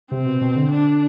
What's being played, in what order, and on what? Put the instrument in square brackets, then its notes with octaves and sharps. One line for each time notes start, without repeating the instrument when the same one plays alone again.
[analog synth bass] C3 [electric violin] C4
[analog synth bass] B2
B2
D3
[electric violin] D4